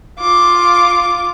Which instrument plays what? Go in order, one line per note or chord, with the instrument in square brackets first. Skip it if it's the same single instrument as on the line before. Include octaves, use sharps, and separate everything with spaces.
[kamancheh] F4 D6